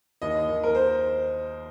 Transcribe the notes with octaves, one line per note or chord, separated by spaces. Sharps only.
D#2 D#5
D#2
A#4
C5